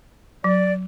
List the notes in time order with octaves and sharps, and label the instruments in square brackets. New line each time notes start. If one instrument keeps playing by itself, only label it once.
[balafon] F#3 [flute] D5